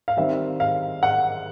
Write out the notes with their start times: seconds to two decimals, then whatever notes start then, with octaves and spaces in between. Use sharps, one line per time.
0.08 F5
0.17 D#3 G3 C4 E5
0.60 F5
1.03 F#5